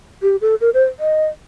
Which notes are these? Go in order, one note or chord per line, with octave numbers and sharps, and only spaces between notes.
G4
A4
A#4
C5
D#5